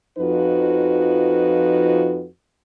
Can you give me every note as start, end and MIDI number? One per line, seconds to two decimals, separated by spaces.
0.18 2.25 41
0.18 2.25 53
0.18 2.25 63
0.18 2.25 66
0.18 2.25 71